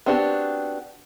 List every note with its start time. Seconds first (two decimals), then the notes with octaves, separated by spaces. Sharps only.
0.06 B3 C4 D4 F#4 G4